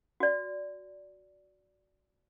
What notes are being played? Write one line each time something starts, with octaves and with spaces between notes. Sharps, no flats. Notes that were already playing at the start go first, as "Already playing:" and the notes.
F#4 D5